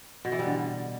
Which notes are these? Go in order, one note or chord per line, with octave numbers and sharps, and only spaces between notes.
B2
E3
G3
D3